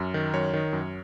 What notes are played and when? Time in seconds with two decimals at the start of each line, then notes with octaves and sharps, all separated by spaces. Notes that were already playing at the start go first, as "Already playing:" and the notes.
Already playing: F#2
0.14 D#3
0.33 F#2 C#5
0.53 D#3
0.73 F#2